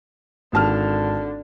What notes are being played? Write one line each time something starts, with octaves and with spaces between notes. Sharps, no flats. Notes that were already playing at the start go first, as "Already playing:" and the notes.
G#1 D3 A5 F6